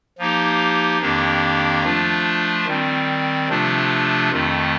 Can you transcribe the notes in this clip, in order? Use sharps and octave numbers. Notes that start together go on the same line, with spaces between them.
F3 A#3 D#4 G4
F2 D#3 A#3 D4 G4
F3 A3 D4 F4
D#3 G3 C4
C3 F3 A3 D4 F4
F2 D#3 A3